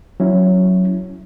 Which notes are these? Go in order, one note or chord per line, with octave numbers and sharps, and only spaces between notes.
F#3 C#4 E4